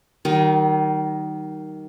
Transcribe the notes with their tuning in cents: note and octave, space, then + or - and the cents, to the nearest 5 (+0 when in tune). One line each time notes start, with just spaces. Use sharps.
D#3 +0 G3 -40